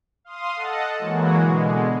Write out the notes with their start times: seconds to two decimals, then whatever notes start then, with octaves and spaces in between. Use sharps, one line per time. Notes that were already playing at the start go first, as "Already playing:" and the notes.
0.24 F5 C6 D#6
0.56 A4 D#5 F#5 A5
0.99 E3 F#3 G#3 A#3 F#4
1.39 B2 D3 G#3